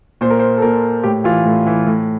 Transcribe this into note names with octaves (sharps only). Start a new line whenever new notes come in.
A#2 C5
A#4
C5
A4
A#2 A#4
A2 G4
E3 F4
A2
E3
A2